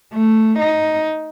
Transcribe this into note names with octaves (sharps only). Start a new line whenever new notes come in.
A3
D#4